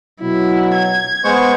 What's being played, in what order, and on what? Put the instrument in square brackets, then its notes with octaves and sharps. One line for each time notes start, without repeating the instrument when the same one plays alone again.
[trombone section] B2 F#3 [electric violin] E4
[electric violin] G#6
[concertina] G#3 C5 C#6 [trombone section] B3